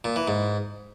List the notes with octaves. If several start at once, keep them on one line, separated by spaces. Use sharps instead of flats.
A#2
E3
G#2